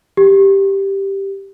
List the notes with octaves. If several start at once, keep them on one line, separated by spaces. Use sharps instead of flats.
G4